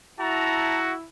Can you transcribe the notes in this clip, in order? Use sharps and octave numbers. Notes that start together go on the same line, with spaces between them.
E4 F#4 A5 A#5